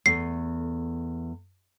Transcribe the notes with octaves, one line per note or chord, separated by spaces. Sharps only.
E2 A3 C7